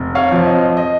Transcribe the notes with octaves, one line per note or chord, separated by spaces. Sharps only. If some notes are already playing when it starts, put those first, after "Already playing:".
Already playing: F1
C#5 F5
F2 F3
D#5
D#5